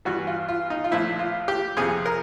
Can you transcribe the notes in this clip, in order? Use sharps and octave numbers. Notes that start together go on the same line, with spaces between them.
G2 E3 G3 F#4
F4
F4
D#4
F4
A#1 A2 F3 E4
F4
G4
F2 C3 F3 G#4
A#4